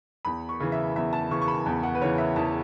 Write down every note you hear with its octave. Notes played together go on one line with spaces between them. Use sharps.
E2 B5
C#6
C#3 E3
E5
E2 E5
A5
C#3 E3 C#6
C#6
B5
E2 A5
F#5
B4
C#3 E3 C#5
E5
E2 A5